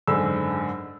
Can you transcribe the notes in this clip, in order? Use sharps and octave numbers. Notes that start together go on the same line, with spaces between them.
F#1 G#2 D3 E6